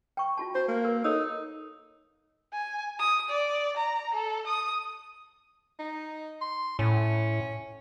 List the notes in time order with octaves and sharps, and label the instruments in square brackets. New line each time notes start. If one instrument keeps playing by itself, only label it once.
[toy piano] G5 C#6
F4 F#4 A5
[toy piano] F#4 [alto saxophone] C5
[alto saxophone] A#3
[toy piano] A#4
[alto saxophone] D#4 [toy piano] A4 C#5 E6
[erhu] G#5
D#6
D5
A#5
A4
D#6
[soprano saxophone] D#4
C6
[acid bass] A2 [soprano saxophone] C#4